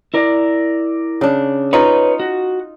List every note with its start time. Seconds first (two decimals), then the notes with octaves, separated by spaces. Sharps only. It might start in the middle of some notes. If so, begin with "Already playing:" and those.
0.14 E4 A#4 D5
1.21 C#3 D4
1.73 D#4 F4 B4 C#5 D#5
2.20 F#4